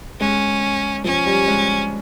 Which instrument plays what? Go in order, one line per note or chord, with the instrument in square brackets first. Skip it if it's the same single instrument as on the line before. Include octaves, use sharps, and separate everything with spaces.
[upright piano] G#3 [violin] C#4
[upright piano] F3 [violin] C#4
[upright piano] G3
G#3